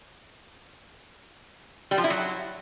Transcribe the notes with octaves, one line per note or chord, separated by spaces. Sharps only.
G3
F3
E4
F#3